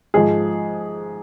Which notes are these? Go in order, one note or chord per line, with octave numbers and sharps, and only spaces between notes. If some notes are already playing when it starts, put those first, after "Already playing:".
G#2 F3 G#4